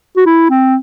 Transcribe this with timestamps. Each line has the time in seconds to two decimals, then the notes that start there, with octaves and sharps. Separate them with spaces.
0.17 F#4
0.26 E4
0.50 C4